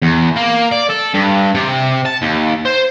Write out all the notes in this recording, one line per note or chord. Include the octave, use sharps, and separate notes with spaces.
E2
A#3
D5
A4
G2
C3
A5
D#2
C5